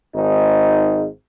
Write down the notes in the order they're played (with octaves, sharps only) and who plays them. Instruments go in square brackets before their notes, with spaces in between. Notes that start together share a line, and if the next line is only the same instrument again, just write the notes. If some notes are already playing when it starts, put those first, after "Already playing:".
[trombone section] G#1 G#2 D#4